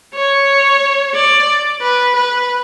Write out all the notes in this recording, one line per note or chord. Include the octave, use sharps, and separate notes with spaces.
C#5
D5
B4
B4